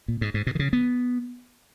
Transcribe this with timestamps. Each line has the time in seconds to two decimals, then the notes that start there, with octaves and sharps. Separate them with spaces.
0.08 A#2
0.21 G#2
0.34 G#2
0.47 B2
0.55 D#3
0.59 C#3
0.73 B3